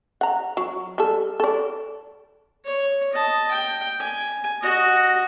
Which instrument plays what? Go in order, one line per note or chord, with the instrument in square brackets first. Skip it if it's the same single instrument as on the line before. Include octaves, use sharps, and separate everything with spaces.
[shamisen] F#5 A#5
F#3
G3 A4
A4 D5
[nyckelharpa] C#5
D#5 A5
G5
G#5
F#4 D#5